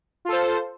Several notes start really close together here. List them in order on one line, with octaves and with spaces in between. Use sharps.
F4 A4 C5